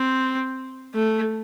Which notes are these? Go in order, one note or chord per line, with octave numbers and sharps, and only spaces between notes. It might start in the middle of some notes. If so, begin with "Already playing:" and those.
Already playing: C4
A3